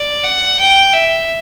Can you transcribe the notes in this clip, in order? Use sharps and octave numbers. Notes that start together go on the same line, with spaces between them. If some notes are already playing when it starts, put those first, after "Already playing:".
Already playing: D5
F#5
G5
E5